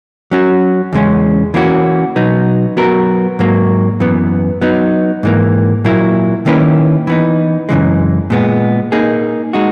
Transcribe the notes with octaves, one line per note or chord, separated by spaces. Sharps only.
F#3 C#4 F#4
E2 C#3 G#3 C#4
E3 A#3 C#4 F#4
B2 F#3 B3 D#4
F#3 B3 F#4 A#4
G#2 F#3 A#3
F#2 E3 B3
F#3 B3 D#4
G#2 E3 A#3
A#2 F#3 A#3 E4
D#3 A#3 C#4 E4 B4
E3 B3 D#4
F#2 C#3 E3 G#3
A#2 G#3 B3
A#3 D#4 G#4
G#3 D#4 F#4